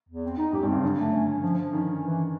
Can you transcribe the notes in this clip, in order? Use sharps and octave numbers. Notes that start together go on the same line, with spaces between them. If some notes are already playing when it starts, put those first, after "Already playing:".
E2
C4
D#4
F#2 G4
G2 C4
C#3
D3 F#3
A3
C#4
C#4
F3
F3
D#3 C#4
C#4
E3